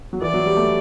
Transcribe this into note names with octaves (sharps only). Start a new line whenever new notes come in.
F#3
E3 D5
F#3
G3
A3